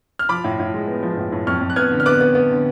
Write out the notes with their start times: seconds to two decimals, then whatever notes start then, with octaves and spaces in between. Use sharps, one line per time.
0.19 F6
0.29 F3 B5 D6
0.44 A2
0.59 A2
0.74 G#3
0.88 B3
1.03 F3
1.17 A2
1.32 A2
1.47 F2 C#6 F6
1.61 F2
1.70 F#6
1.76 B3 F6 G#6
1.92 D3
2.00 F6
2.06 B3 D6 F#6
2.21 B3
2.35 B3
2.50 D3